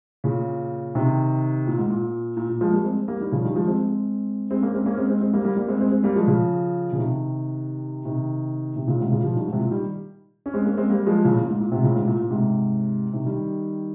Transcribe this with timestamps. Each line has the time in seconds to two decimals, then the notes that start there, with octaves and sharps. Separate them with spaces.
0.24 A#2 C#3
0.95 C3 D#3
1.67 A#2
1.78 G#2
1.89 A#2
2.37 A#2
2.49 A#2
2.61 F3 G#3
2.72 G3 A#3
2.84 G#3 C4
3.08 G3 A#3
3.20 D#3 G3
3.32 C#3 F3
3.44 D#3 G3
3.55 F3 G#3
3.67 G#3 C4
3.79 G#3 C4
4.51 G#3 C4
4.62 A#3 C#4
4.74 G#3 C4
4.86 A#3 C#4
4.97 G#3 C4
5.09 G#3 C4
5.21 G#3 C4
5.33 G3 A#3
5.45 G3 A#3
5.57 G3 A#3
5.68 G#3 C4
5.81 G#3 C4
5.92 G#3 C4
6.04 G3 A#3
6.16 F3 G#3
6.27 C#3 F3
6.92 C#3
6.98 C3 D#3
8.05 C3 D#3
8.76 C3 D#3
8.87 A#2 C#3
9.00 G#2 C3
9.11 A#2 C#3
9.24 C#3 F3
9.35 D#3 G3
9.47 G#2
9.53 C3
9.59 A#2
9.71 D#3 G3
10.46 C#4
10.54 G#3 C4
10.65 A#3 C#4
10.77 G#3 C4
10.89 G3 A#3
11.06 F3 G#3
11.24 A#2 C#3
11.36 A#2
11.49 G#2
11.61 A#2
11.72 G#2 C3
11.83 A#2 C#3
11.95 G#2 C3
12.07 A#2
12.19 A#2
12.31 G#2 C3
13.13 C3 D#3
13.26 D#3 G3